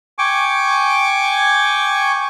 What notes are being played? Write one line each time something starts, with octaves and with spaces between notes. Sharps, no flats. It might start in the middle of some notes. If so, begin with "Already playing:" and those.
G5 G#5 C#6 D6